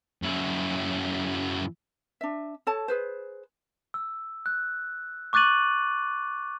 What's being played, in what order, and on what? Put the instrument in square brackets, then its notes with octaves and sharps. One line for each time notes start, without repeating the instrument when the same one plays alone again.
[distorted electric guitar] F#2 E4
[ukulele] D4 E5
A4 C#5 A5
G#4 B4 C5
[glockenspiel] E6
F#6
C#6 D6 F#6 A6 D#7 F#7